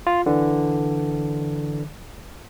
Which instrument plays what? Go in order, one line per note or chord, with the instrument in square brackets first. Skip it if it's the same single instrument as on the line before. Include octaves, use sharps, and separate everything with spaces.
[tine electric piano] F4
D3 E3